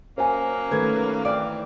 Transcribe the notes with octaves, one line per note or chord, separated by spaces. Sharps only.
F#3 A#3 C#4 C5 G#5
D#3 A3 A4 B4 G#6
E3 C4 D5 F5